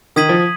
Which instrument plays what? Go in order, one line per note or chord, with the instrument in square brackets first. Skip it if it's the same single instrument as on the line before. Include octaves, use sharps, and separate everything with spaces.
[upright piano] D#3 [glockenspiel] D#6 G#6 B6 D#7 F#7
[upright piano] F3